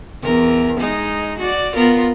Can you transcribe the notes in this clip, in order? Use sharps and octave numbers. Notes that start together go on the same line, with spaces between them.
E2 A#4
G#3 D#4
F#4 D5
B3 F4 A#4